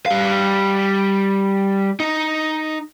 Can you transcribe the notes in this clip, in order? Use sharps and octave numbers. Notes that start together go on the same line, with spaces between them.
G3 F5
D#4